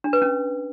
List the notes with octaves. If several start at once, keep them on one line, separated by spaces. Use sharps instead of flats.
D4
B4
C#4